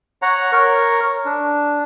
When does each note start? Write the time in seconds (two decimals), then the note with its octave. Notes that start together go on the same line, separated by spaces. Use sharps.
0.22 C#5 F#5 A#5
0.52 A#4 C#5
1.26 D4